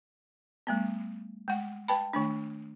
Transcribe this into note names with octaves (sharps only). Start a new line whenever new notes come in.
G3 A3 B3
G#3 F#5
B4 G5 A5 B5
D#3 A3 D4